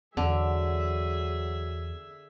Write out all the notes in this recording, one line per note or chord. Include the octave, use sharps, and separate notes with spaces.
E2 D3 F#3 G#4 E5